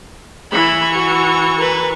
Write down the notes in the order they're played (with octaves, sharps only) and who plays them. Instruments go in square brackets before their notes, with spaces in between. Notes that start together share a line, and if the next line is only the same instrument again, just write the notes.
[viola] E3 C#6 [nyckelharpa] E4 B5
[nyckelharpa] F#4
A#4 B4